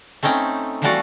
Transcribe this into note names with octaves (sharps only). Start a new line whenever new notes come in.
A3 C4 C#4 D#4 G5
E3 F3 G3 A3 F#4 D5